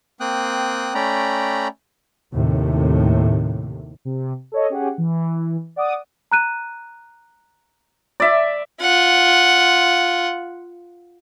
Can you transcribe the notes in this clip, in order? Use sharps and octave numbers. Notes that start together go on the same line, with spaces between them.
A#3 C4 G5 D#6 F#6
A3 C#4 D5 G5 A#5 B5
D#2 A2 C3
C3
A4 C#5 D#5
C#4 G4 G#4 F#5
E3
D5 F#5 D6 D#6
A#5 F#6 D#7
D5 E5
F4 F#5